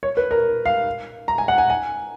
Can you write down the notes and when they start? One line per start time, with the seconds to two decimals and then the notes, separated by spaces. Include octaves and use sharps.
0.03 C#5
0.17 B4
0.31 A#4
0.65 F5
1.28 A#5
1.38 G#5
1.48 F#5
1.58 G#5
1.70 G#5